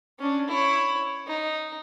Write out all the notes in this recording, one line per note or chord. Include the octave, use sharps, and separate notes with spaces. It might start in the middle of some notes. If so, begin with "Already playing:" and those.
C#4 D4
E4 C#5
D#4